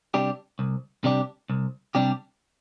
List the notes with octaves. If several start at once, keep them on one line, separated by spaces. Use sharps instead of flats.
C3 G3 D4 G4
C2
C3 G3 D4 G4
C2
C3 G3 D4 G4